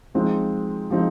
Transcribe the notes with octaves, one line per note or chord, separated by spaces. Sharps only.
F3 G#3 C4 D#4
F3 G#3 C4 D#4